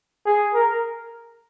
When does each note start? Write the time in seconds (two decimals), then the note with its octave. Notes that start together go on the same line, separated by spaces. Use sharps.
0.25 G#4
0.54 A#4